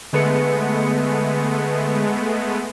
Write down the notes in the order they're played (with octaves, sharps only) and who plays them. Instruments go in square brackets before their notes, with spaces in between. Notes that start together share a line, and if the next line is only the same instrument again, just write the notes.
[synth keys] D3 B4 C#7 [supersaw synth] G#3 A3 B3